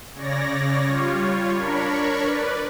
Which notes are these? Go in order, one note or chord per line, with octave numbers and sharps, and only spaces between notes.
C#3 C#5 D5 A#6
G3 F4 C#5
D4 A#4 C#5 B5 C#6
B4 D5